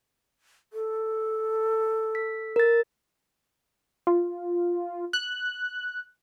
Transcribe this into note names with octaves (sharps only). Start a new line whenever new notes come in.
A4
B6
A#4 A6
F4
F#6